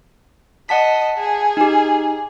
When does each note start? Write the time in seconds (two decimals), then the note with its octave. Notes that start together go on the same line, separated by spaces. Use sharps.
0.69 D#5 F#5 A5 B6
1.18 G#4
1.57 D#4 G4